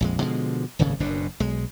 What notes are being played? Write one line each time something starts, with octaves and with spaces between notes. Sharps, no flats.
A#1 F2 G#3
B2 D3 F3 G#3
D#1 G#1 A2 C#3
F#1 F#2 B2 D4
B1 G#3